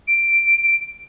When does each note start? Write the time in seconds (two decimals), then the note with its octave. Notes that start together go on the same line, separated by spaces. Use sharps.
0.07 D7